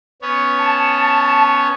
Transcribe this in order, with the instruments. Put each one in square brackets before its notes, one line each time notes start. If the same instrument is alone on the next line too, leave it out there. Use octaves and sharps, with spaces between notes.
[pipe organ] B3 C#4 C#5
[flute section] A5